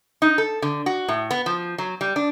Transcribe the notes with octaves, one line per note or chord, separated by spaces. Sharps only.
D#4
A4
D3
F#4
A2
B3
F3
F#3
G3
D4